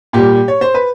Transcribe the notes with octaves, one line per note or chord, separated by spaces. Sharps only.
A#2 G3 G4
C#5
C5
B4